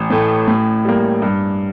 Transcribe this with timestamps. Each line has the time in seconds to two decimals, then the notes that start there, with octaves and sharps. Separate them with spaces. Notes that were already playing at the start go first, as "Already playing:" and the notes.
Already playing: A1
0.10 A2 A3
0.48 A2
0.85 G3 A#3
1.22 G2